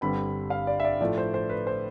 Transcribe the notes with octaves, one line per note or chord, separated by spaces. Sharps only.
G1 G2 D3 G3 C4 B5
F5
D5
E5
D5
A2 F3 A3 D5
C5
C5
B4
C5